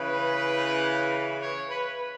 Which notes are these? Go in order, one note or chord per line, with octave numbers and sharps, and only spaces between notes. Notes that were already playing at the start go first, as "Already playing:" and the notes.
Already playing: C#3 E3 B4
C#5
B4